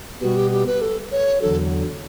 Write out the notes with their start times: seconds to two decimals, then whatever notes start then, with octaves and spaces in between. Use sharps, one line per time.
0.22 B2 G3 B3 F#4
0.36 G4
0.51 G4
0.66 B4
0.81 A4
1.12 C#5
1.41 E2 D3 F#3 A4